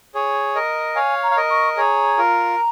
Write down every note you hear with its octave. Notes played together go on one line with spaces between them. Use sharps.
G#4 C#5
A#4 D#5
C#5 F5 G#5
A#5
F5
A#4 D#5
C#6
G#4 C#5 A#5
F4 A#4